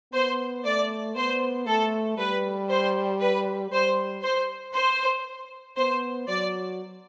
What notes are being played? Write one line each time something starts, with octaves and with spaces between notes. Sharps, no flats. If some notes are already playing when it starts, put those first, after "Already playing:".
B3 C5
A3 D5
B3 C5
A3 A4
G3 B4
C5
B4
G3 C5
C5
C5
B3 C5
F#3 D5